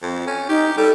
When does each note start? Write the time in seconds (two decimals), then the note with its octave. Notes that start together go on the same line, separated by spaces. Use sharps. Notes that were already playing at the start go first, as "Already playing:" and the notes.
0.02 F2
0.27 C#4
0.49 D#4 G4
0.77 G3 A4